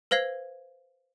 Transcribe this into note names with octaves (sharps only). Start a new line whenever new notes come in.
B4 C5 F5 G#6 C7